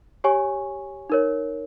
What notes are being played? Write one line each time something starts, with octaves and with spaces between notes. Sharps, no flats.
G4 C#5 G#5 C#6
D#4 A#4 C#5